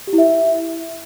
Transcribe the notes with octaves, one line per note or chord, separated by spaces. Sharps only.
G4
E4
E5